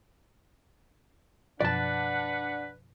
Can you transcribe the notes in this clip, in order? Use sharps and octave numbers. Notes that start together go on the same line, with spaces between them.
F#2 B2 F3 D4 B4 D5 F#5 A5